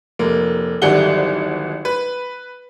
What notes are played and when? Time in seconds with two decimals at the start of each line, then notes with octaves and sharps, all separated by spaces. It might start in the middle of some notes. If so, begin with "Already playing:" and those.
0.19 F1 A#3
0.82 D1 G#1 D3 G3 F#5 G7
1.85 B4